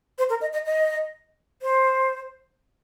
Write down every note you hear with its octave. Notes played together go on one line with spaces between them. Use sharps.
C5
A#4
D#5
D#5
D#5
C5